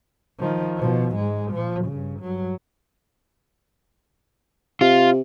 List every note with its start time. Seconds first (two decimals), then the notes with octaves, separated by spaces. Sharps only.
0.39 D#3 F3
0.77 B2 F3
1.15 G#2 G#3
1.52 A#2 F3
1.85 G2 C#3
2.20 G2 F#3
4.81 C3 F4